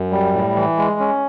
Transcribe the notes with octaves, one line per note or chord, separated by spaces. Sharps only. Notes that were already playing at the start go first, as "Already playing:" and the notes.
Already playing: F#2
G3
A2
E3
G#3
C#4